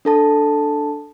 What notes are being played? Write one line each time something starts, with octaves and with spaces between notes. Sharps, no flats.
D4 A4 A5